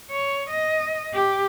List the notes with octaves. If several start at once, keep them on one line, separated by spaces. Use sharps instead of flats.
C#5
D#5
G4